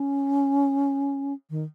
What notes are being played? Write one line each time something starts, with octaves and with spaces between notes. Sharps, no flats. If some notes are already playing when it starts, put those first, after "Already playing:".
Already playing: C#4
D#3